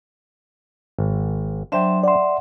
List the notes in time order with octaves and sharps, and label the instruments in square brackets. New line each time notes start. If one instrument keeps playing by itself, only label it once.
[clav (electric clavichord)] G#1
[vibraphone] F#3 E5 C6 [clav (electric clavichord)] D4 C5 G5
[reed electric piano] D5 C6 [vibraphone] E5 F#5